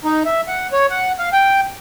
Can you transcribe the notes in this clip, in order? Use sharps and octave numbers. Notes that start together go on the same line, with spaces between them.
D#4
E5
F#5
C#5
F#5
F5
G5